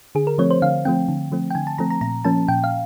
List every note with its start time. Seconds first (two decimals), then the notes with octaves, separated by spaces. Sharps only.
0.15 D3 G#4
0.27 A#4
0.38 F3 A3 C4 C#5
0.51 C5
0.62 D3 F5
0.85 F3 A3 C4 G5
1.08 D3
1.32 F3 A3 C4
1.50 G5
1.55 D3 G#5
1.67 A5
1.78 F3 A3 C4 A#5
1.90 A#5
2.01 A#2 A#5
2.24 F3 A#3 C#4 A5
2.48 A#2 G5
2.64 F5